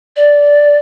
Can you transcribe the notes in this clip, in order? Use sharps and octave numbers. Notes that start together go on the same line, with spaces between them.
D5